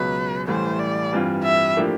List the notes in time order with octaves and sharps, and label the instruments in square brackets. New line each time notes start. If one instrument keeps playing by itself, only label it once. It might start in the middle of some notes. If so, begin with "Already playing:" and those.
Already playing: [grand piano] C#2 B2 F#3 [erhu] B4
[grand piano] A1 A2 E3 G3 [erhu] C5
[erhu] D5
[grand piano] G2 E3 G3 C4 F4
[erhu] E5
[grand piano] A2 F3 A#3 D4 G4